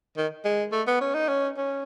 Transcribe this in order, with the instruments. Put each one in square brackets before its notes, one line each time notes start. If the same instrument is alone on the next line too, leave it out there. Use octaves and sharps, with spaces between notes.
[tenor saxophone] D#3
G#3
A3
B3
C#4
D#4
C#4
C#4